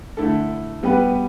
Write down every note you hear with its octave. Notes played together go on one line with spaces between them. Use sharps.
D3 A3 E4 A4
G3 B3 G4 B4